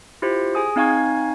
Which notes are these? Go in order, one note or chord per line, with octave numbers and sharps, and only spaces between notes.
E4 F4 G4 C5
G#4 G#5 D#6
C4 D#4 F5 G#5 C#6 G#6